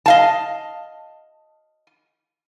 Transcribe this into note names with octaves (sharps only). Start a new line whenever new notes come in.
D#5 F5 A5